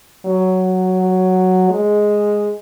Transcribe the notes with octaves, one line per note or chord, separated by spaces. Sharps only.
F#3
G#3